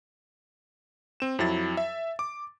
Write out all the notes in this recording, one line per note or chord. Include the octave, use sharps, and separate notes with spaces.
C4 E7
F2 F#3 E4 A6
E5
D6